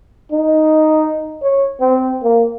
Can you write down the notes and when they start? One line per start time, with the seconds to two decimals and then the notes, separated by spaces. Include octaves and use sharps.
0.32 D#4
1.42 C#5
1.81 C4
2.23 A#3